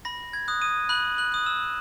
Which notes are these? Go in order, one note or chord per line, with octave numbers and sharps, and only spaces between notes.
B5 A#6
G#6
D#6 F#6
D#6 D#7
B5 F#6 F#7
F#6 F#7
D#6 F#6
E6 E7